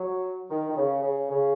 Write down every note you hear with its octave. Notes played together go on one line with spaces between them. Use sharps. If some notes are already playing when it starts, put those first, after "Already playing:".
Already playing: F#3
D#3
D#3
C#3
C#3
C#3